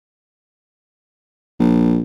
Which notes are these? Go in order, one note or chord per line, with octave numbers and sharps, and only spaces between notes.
A#1